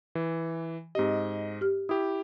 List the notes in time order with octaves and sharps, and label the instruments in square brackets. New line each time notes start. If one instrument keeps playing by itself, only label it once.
[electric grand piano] E3
[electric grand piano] G#2 D#5 [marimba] C4 G4
[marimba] G4 F6
[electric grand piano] E4 G4 [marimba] D#6